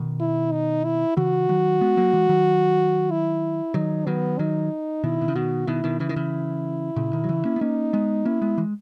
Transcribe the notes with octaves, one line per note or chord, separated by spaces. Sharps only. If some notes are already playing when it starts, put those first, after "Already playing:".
Already playing: B2 D#3
E4
D#4
E4
C#3 E3 F#4
D#3 F#3
G#3 B3
F#3 A#3
E3 G#3
D#3 F#3
E4
D#3 F#3 D#4
D#3 F#3 B3
D#3 F#3 D#4
B2 D#3 E4
B2
C#3
B2 D#3 F#4
B2 D#3 E4
B2 D#3
C#3 E3 E4
D#3
C#3 E3
A#2 C#3
B2 D#3
F#3
C#3 E3
A#3 C#4
B3
A#3 C#4 D#4
G#3 B3
A#3 C#4 E4
G#3 B3
E3 G#3